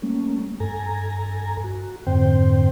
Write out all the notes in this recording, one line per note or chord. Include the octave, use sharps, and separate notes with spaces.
G3 A3 A#3 C#4
G2 A4 G#5 A#5
F#4
F2 G#2 D3 C4 C5 G5